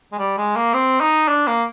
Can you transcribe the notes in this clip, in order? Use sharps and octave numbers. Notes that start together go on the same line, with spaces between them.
G#3
G3
G#3
A#3
C4
D#4
D4
A#3